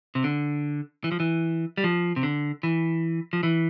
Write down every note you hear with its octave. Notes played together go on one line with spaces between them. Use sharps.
C3
D3
E3
F3
E3
G3
F3
C3
D3
E3
F3
E3